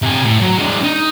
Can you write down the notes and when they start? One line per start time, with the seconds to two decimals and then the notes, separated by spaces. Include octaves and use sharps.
0.02 C3 G#5
0.24 A2
0.41 F#3
0.58 G#3 D4
0.84 D#4